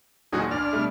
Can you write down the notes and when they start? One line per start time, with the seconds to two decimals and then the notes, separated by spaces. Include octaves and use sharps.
0.33 E1 A#2 F#3 D#4 F#4 G#4
0.51 C#2 D4 D5 F6
0.73 B2 G3 A3